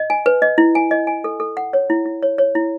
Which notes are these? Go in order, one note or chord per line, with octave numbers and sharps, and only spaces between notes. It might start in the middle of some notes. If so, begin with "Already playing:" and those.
Already playing: D#5
G#5
B4
D#5
E4
G#5
D#5
G#5
A4
A4
F#5
C#5
E4
E4
C#5
C#5
E4